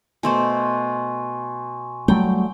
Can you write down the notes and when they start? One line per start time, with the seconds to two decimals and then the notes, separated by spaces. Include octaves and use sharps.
0.23 B2 A3 C5 G#5 C6 C#6
2.08 F#3 G3 A3 G5